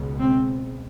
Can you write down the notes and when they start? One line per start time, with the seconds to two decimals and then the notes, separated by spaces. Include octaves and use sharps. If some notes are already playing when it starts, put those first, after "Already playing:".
Already playing: C#2 B2
0.18 C4